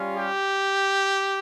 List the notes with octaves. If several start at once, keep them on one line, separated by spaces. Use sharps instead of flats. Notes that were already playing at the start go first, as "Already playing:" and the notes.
Already playing: G3 C#4 F4
G4